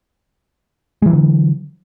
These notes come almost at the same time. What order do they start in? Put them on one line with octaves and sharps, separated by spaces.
G#3 E3 F#3 D3